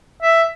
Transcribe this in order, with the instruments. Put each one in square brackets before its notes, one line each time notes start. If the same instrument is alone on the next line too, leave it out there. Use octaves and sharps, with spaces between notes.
[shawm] E5